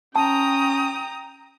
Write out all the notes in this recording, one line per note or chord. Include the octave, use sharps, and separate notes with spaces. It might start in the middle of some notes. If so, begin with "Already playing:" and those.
C#4 G5 A5 A#5 D#6